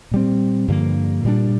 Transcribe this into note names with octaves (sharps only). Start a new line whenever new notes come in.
A#2 G3 C4
G2 D3 F3 A#3
A#2 G3 D4